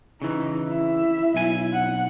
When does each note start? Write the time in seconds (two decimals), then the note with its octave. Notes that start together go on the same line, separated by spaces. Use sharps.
0.22 C#3 E3 D#4
0.68 E4 E5
1.34 B1 G#5
1.73 F#5